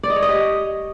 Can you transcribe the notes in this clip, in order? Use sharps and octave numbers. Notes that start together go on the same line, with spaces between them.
D5
D#5
C#5
D#5
G4